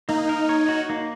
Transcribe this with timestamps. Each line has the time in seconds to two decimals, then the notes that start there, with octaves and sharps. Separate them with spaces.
0.08 A#3 D#4
0.29 A#4
0.49 C#5
0.69 F#4
0.90 A#3